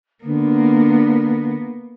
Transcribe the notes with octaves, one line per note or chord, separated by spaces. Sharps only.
D3 A#3 B3